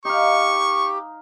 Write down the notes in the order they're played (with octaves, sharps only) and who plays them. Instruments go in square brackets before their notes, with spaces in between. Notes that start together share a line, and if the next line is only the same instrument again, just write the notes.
[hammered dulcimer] D#4 F5 [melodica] G4 [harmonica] C#6